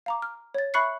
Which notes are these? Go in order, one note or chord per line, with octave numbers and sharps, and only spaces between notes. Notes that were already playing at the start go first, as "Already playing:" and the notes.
F5 A#5 D6
F6
C#5 A6
E5 B5 C#6 F#6 C7 C#7